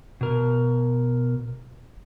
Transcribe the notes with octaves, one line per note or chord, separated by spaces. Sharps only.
B2 A#4